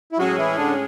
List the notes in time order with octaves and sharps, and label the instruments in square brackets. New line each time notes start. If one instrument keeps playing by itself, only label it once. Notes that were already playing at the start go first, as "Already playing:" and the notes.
[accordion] E4
[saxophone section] A2 G#3 C#4 G#4 [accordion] F#3 F#4
[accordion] E3 E4
D3 D4